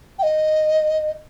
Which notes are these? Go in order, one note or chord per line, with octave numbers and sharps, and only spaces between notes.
G5
D#5